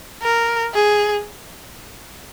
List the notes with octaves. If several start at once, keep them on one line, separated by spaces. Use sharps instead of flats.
A#4
G#4